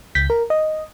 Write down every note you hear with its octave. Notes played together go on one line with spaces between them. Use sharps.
C#2 G6 B6
A#4
D#5